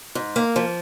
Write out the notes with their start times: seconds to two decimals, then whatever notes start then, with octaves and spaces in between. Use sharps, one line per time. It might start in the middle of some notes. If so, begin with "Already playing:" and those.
0.15 G#2
0.36 A#3
0.56 F3